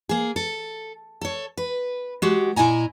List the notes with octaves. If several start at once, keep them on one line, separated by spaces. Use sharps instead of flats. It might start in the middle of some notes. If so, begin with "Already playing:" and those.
A#3 G#4
A4
A4 C#5
B4
G#3 F#4 G4
A#2 E4 D#5 G#5 A#5